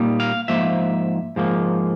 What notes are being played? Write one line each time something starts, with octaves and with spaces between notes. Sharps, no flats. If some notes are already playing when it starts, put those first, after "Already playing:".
Already playing: A#2 G3 A#3 D#4
F5
G#2 F3 A#3 E5
G#2 F3 A#3